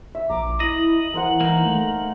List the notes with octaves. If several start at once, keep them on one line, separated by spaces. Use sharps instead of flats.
E5
A#1 A#5 D6
E4 D#5 F#7
E3 A#4 C5 F#5
A#3 D#4
A3